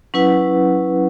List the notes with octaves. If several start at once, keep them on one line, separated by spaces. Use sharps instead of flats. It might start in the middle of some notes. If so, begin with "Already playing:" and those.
F#3 C#4 E4 B4 F#5